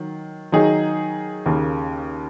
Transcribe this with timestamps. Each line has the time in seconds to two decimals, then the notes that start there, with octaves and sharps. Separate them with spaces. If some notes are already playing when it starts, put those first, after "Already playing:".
Already playing: D#3 F#3
0.52 D#3 F#3 D#4 G#4
1.46 D#2 C#3 A#3